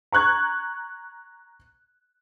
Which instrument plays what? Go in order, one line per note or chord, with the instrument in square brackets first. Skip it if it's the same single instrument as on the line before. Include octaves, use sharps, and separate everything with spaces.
[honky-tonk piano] A#5 C#6 F#6 G#6